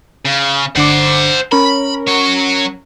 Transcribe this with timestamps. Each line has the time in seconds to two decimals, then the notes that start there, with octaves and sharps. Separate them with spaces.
0.25 C#3
0.75 G1 D3 C5 F#5 D6
1.52 C#4 A#4 B5
2.07 F#3 C#5